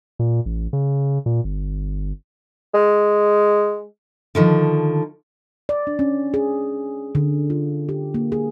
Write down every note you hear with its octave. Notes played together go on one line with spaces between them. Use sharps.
A#2
A1
C#3
A#2
G1
G#3
D3 D#3 F3
D5
D4
C#4
G#4
D3
F4
G4
A#3
G#4